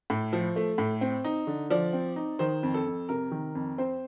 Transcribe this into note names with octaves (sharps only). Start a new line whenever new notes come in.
A2
F3
A3
A2
C4
D#4
D3
F3 D5
C4
D#4
D#3 C5
F2
A4
F2
C3 A#4
D#3
F2
C4 C5